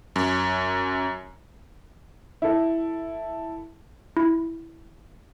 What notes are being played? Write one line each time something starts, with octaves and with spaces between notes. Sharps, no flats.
F#2
E4 A4
E4